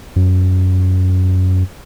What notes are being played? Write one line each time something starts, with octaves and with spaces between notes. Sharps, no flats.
F#2